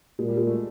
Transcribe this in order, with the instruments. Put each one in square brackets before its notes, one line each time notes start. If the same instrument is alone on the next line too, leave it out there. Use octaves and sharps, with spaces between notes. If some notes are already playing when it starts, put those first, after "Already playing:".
[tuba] A#2 [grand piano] G#3
[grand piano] G3
G#3
A3